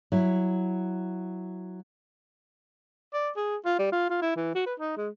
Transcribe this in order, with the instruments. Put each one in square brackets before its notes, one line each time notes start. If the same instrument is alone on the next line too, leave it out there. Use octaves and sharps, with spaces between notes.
[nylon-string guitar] F#3 E4
[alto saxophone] D5
G#4
F4
G3
F4
F4
E4
E3
F#4
B4
D#4
G#3